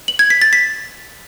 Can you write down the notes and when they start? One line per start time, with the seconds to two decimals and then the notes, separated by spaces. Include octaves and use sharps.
0.08 F#7
0.19 G#6
0.30 B6
0.42 A6
0.53 B6